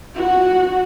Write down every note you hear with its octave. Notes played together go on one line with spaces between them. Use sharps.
F#4 F#5